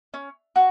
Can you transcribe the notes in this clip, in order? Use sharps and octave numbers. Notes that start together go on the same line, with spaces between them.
C#4
F#4